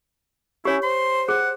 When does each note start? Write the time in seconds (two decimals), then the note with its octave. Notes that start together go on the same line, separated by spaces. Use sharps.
0.65 C#4 E4 G4 C#5
0.83 C5 C6
1.29 G#4 F#5